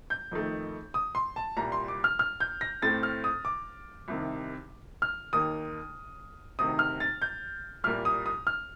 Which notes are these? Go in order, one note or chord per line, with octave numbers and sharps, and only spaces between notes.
G6
F2 D#3 A3
D#6
C6
A5
C2 A#2 G3 A#5
C6
D6
F6
F6
G6
A#6
A2 A3 C4 A6
F6
D#6
D6
C2 C3 D#3
F6
D#2 D#3 A#3 D#6
D2 C3 D#3 D#6
F6
A6
G6
C2 A#2 G3 A#3 F6
D#6
D#6
F6